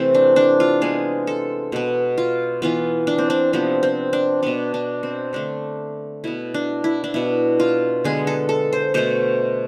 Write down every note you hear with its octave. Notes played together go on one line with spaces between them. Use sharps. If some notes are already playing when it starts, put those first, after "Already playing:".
Already playing: C3 E3 A3 C4
D4
D4
F4
C3 G#3 B3 G#4
A4
B2 B3
F4
E3 B3 F4
D4
C4
D4
C3 F3 B3 C4
C4
D4
B2 B3 D4
D4
C4
D3 A3 D4
B2 B3 E4
D4
E4
D4
B2 B3 E4
F4
D3 G#3 B3 G#4
A4
A4
C5
B2 A3 C5